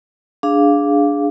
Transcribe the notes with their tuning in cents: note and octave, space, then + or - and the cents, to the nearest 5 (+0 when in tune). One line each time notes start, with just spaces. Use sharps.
D4 -5 G#4 -5 F5 +0